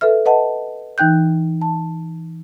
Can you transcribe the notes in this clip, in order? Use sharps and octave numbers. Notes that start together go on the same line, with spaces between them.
A4 B4 E5 F6
B4 D#5 F#5 A5
E3 D#4 G5 F#6 G6
A5